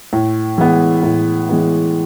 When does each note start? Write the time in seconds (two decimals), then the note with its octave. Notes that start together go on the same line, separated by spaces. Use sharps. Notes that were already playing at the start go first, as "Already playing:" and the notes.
0.13 A2
0.58 E3 G#3 B3
1.03 A2
1.49 E3 G#3 B3